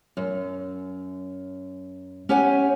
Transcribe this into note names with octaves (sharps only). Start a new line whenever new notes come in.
F#2
C#4 G4 C#5 F#5 G#5